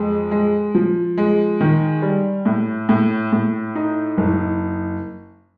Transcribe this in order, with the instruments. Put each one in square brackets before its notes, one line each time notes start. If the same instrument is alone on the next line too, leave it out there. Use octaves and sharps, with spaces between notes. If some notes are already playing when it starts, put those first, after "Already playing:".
Already playing: [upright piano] F2 G#3
G#3
F3
G#3
D#3
G3
A2
A2
A2
D#4
F#1